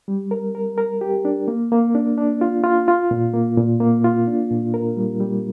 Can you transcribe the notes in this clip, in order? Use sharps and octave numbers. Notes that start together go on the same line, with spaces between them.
G3
A#4
A#4
A#4
G4
D4
A#3
A#3
D4
D4
F4
F4
F4
A#2
A#3
A#2
A#3
F4
D4
A#2
A#4
G3
G3